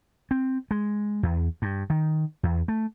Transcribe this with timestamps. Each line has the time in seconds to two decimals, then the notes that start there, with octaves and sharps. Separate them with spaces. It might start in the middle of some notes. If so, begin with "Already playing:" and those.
0.31 C4
0.71 G#3
1.23 E2
1.62 G2
1.90 D#3
2.43 E2
2.68 A3